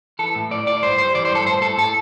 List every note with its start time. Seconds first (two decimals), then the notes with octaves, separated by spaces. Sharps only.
0.19 E3 A4
0.35 A2
0.51 A3 D5
0.67 A2 D5
0.82 G2 C5
0.98 G3 C5
1.15 E3 D5
1.25 C5
1.30 G2 A4
1.46 A2 C5
1.62 A2 A4
1.78 A2 A4